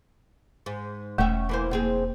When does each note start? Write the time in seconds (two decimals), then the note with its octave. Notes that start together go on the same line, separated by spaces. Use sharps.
0.66 G#2
1.18 E1 A3 C#4 E5 G5
1.49 E3 A#3 C5
1.71 F2 A#3 C4 G#4